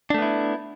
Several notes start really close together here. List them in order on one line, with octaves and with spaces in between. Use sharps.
D4 A3 B3 E4